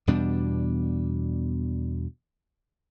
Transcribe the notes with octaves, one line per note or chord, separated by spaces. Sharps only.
E2 B2 G3 D4